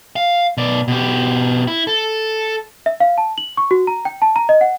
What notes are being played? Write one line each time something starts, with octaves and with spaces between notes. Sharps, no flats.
F5
B2 D5
B2 G4
E4
A4
E5
F5
A5
F#7
C#6
F#4
A#5
G5
A5
A#5
D#5
F#5